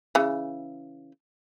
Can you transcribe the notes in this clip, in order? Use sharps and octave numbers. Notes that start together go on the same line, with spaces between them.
C#3 E3